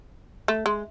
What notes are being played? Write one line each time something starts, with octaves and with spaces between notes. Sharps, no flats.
A3
G#3